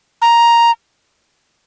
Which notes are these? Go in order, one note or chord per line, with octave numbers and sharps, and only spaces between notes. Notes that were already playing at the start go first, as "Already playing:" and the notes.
A#5